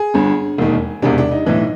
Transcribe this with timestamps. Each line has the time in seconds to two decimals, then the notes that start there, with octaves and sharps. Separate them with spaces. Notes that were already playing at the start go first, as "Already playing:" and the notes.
Already playing: G#4
0.14 G1 G2 D3
0.58 E1 D#2 D#3
1.02 E1 E2 C3 D4
1.18 D4
1.31 D#4
1.46 B1 A2 E3